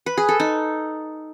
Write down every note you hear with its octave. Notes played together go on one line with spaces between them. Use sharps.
B4
G#4
A4
D#4